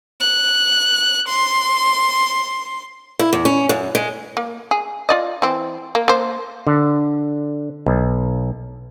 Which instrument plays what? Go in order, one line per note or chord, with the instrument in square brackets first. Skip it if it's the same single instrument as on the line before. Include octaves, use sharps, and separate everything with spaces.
[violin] F#6
C6
[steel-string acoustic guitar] E4
E2
C#4
F#2
G#3
[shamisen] A#3
G#4
F4 D5 D#5
E3 C4
A#3
A#3 C5
[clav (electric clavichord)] D3
B1